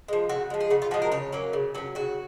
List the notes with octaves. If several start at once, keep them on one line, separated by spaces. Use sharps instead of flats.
F3 G#3
C#3 F#4
F3 G#3
G#4
C#3 F#4
F4
F3 G#3 F#4
A#4
C#3 C#5
F#3 A#3 C#4
C#3
F#3 A#3 C#4
C#3 F#4